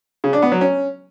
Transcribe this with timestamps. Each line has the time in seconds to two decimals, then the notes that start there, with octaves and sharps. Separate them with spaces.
0.24 C#3
0.33 D4
0.42 B3
0.52 F#3
0.61 C#4